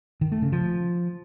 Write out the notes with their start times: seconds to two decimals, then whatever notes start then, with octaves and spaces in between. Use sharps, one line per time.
0.21 D#3
0.32 A3
0.42 C#3
0.52 F3